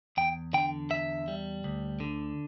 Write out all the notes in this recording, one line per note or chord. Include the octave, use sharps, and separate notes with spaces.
E2 G5
D3 G5
E2 E5
G3
D2
D3